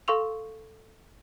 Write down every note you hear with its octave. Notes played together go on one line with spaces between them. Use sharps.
A4 F5 C6 C#6 E6 F7